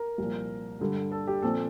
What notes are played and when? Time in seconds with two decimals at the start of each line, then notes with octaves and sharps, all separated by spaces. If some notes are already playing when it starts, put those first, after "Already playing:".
Already playing: A#4
0.18 C2 A#2 F3
0.80 G2 D3 G3
1.12 A4
1.27 G4
1.42 A#2 F3 C4 A4